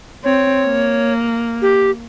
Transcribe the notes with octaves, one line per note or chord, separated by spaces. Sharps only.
C4 C#5
A#3
G4